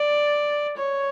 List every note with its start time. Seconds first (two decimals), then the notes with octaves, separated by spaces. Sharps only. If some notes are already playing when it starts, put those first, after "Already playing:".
Already playing: D5
0.77 C#5